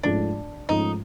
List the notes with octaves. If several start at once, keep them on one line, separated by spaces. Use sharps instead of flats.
G#2 F3 A3 C#4 D4
G#2 F3 A3 C#4 D#4